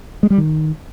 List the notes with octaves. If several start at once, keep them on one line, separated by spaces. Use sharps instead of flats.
G#3
G3
D#3